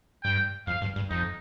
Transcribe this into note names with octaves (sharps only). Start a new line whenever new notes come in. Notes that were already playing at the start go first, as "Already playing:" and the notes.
G2 G5
F2 F5
G2
G2
F2 D#4